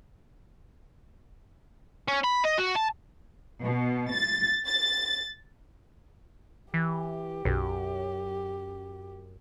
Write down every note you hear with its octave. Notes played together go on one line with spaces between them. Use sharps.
C#4
B5
D#5
F#4
A5
B2
A6
A6
E3 G4
B1 F#2